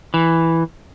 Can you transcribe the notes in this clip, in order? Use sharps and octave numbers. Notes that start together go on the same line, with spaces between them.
E3